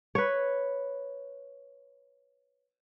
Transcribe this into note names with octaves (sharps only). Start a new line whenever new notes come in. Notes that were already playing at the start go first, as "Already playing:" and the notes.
B4 C#5